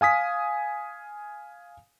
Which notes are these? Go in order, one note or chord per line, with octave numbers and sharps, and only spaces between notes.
F5 G#5 D#6 B6